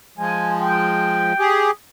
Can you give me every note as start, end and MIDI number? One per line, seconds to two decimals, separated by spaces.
0.18 1.33 53
0.18 1.33 56
0.18 0.58 80
0.61 1.66 79
1.39 1.71 67
1.39 1.71 68